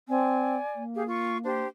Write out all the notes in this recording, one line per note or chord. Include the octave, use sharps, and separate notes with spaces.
C4 D5 G#5
A#3
G4 G#4 F5
F4 C#6
D4 G4 C5